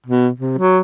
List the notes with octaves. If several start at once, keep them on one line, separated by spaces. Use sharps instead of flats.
B2
C3
F#3